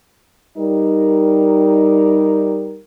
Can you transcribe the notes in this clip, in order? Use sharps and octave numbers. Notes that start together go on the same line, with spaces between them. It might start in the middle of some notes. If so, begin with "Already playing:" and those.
G3 D#4 A#4